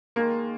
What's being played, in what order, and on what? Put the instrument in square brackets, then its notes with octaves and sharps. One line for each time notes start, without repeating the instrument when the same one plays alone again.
[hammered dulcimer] D#3 G#3 F4 [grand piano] A#3